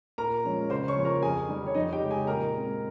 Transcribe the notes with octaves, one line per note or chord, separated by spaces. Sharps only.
A#2 A#4 A#5
F3 G#3 C#4
C#3 C5 C6
C#5 C#6
F3 A#3 C#4
A#4 A#5
F2 G#4 G#5
D#3 G3
C#5
F2 D#4 D#5
G4 G5
C#3 G#3 C#4
G#4 G#5
A#2 A#4 A#5
G#3 C4